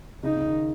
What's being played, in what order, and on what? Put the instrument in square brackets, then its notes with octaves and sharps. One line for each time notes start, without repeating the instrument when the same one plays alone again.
[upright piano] C#3 [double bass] D#4
[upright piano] C#3
D#3